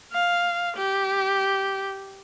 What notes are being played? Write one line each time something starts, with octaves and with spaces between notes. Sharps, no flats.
F5
G4